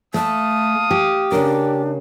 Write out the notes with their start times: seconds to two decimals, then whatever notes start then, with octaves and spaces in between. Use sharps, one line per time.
0.14 A3 F5 A5 D#6
0.91 G4
1.32 C#3 C#4 D4 A#4